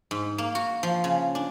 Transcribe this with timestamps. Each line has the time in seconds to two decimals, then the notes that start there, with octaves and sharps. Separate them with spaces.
0.11 G#2
0.38 A#3
0.55 F#4
0.83 F3
1.04 C#3
1.35 D4